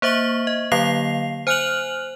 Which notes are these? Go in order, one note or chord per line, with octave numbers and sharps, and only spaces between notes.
A#3 C5 E5 C#6 F#7
D#5
D3 F#3 A#3 F5 C7 F7
C5 G#5 F6 F#6 F7 F#7